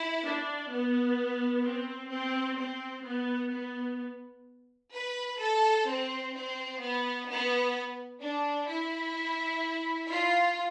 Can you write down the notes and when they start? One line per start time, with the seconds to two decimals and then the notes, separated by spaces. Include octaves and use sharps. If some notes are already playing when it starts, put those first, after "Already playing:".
Already playing: E4
0.23 D4
0.70 B3
1.63 C4
2.11 C4
2.58 C4
3.05 B3
3.51 B3
4.93 B4
5.39 A4
5.86 C4
6.33 C4
6.80 B3
7.28 B3
8.21 D4
8.68 E4
10.09 F4